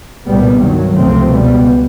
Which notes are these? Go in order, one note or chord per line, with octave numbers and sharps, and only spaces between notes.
C2 A#2 G3 B3
G2 D#3 F#3
C#2 C3 F3 A3 C4
C#2 B2 G3 B3